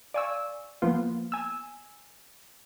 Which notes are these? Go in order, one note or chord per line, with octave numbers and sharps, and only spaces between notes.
D5 F5 G#5 C#6 E6
F3 A#3 B3 F4
G#5 E6